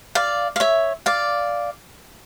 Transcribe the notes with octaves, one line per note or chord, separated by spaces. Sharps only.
D5 F5
F5
C#5 E5
D5 F5